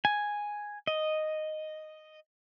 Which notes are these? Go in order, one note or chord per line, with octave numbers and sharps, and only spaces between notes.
G#5
D#5